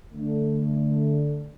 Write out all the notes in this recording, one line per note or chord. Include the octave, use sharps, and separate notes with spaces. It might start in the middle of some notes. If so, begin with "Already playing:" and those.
D3 A3